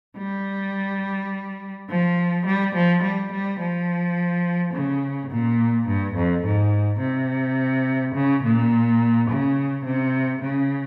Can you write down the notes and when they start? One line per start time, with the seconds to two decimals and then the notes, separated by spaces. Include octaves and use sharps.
0.18 G3
1.88 F3
2.45 G3
2.73 F3
3.02 G3
3.31 G3
3.59 F3
4.73 C#3
5.30 A#2
5.87 G2
6.15 F2
6.43 G#2
7.01 C3
8.14 C#3
8.43 A#2
9.28 C#3
9.85 C3
10.41 C#3